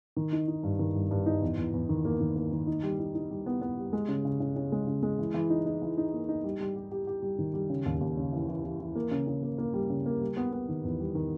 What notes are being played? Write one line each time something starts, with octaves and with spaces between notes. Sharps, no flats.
D#3
D#4
D#4
G2
D#3
G2
G2
D#4
E2
E2
E2
D#3
A#3
D#3
A#3
D#3
D#4
G3
D#4
D#4
G3
B3
B3
G3
G#3
C#3
C#3
C#3
C#3
G#3
C#3
G#3
E3
E3
D#4
D#4
E3
D#4
A#3
D#4
G3
G3
G4
G4
G4
G3
D#3
G3
C#3
D#2
D#2
C#3
E3
E3
E3
E3
A#3
C#3
C#3
A#3
A#3
G3
C#3
A#3
G3
B3
B3
D#3
E2
G3
D#3